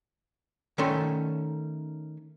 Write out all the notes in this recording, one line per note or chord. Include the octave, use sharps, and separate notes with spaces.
D#3 A3 C#4 A4 C6